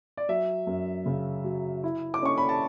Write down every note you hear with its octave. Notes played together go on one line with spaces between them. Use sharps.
D5
F#3 E5
F#2
C#3
F#3
E4
D6
C#4 C#6
B5
A5